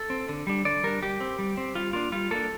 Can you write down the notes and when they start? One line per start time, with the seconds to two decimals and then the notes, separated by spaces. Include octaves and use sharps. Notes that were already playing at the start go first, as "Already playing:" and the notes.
Already playing: A4
0.10 C4
0.29 D3
0.47 G3 D4
0.65 D3 D5
0.83 G3 D4 A#4
1.02 G3 G4
1.20 C4
1.39 G3
1.57 C4
1.75 G3 F4
1.93 A#3 D4 F4
2.12 G3 F4
2.31 A#3 D4 A4